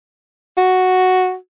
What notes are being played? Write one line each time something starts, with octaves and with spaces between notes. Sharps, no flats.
F#4